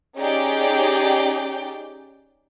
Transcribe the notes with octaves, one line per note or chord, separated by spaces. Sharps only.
C#4 D#4 G4 G#4 D5 G5